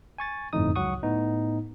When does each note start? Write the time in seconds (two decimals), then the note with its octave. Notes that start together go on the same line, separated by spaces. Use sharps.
0.18 G#5 C#6 A6
0.53 G1 F2 A2 D#4 D#6
0.75 C#2 F#3 F#5 C#6 D#6
1.03 A2 B3 D#4